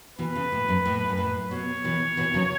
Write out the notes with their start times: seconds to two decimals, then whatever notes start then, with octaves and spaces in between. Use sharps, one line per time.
0.18 B2 E3 B4
0.35 C#3
0.52 A2
0.68 F#2
0.86 A2
1.09 F#2
1.18 A2
1.51 B2 C#5
1.84 B2 E3
2.17 B2 E3
2.34 C#3 F#3